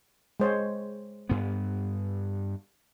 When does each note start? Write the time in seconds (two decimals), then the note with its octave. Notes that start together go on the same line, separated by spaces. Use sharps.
0.40 G#3 C5 C#5
1.29 G2 B3